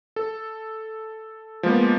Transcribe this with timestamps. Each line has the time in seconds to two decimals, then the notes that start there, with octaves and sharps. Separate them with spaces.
0.16 A4
1.63 F3 G#3 A#3 B3